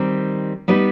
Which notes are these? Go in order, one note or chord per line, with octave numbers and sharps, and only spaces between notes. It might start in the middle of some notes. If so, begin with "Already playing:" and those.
Already playing: D#3 G3 C4
G3 B3 D#4 B4